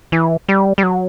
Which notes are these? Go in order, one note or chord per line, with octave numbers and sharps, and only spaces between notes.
E3
G3
G3
F#3